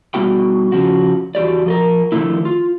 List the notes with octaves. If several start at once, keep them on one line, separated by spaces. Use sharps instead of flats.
B2 G3 B3 F#4 G5
C#3 F3 F#4
E2 F#4 G4 D5
F3 A4 A#4
D3 D#3 F3 A3 B3 E4
F4